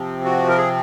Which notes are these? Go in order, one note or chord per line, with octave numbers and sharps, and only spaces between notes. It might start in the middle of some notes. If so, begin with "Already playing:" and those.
Already playing: C3 F3 C4
F#4
A#4
G#4